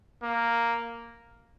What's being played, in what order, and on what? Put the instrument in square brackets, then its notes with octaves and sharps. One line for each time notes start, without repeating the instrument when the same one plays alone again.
[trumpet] A#3